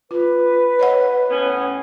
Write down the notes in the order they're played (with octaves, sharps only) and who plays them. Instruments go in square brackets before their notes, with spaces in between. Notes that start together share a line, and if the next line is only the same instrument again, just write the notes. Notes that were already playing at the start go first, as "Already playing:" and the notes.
[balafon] F4 [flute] B4
[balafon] C#5 D#5 F#5
[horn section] A2 B3 C#4